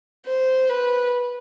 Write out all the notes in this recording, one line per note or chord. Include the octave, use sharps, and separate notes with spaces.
C5
B4